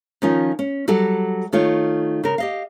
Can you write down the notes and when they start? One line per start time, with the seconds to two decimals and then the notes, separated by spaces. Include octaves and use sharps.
0.22 D#3 F3 C#4 D#4 F4
0.59 C#4
0.88 F#3 G3 F#4 A4
1.53 D#3 A3 F4 C#5
2.24 C#3 A#4
2.38 G4 D#5 F5